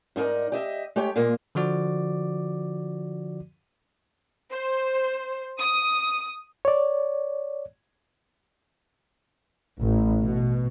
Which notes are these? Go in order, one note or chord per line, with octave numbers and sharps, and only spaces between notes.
G#2 D#4 E4 A#4 D5
G4 D#5 E5
G#3 A3 G4 C#5 G5
A#2 G#3 A#3
D3 F3 F#4 D5 D6
C5
D#6
C#5 D5
A1
B2